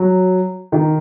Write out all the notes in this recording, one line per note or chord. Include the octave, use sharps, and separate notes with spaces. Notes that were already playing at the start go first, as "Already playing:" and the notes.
Already playing: F#3
D#3